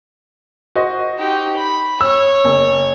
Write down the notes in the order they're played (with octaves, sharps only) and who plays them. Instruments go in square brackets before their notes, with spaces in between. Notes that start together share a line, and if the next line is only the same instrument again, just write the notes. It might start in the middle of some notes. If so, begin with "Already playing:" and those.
[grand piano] F#4 C5 D#5
[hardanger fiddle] D#4 G4
B5
[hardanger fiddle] C#5 [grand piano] E6
[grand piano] F#1